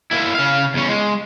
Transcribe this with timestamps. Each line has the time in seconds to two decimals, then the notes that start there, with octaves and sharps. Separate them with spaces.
0.11 A#3 E4
0.35 C#3 F5
0.74 E2 C#4
0.89 G#3